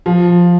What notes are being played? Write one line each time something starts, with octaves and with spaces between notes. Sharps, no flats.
F3